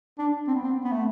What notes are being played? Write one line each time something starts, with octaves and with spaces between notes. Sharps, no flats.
D4
C4
B3
C4
B3
A3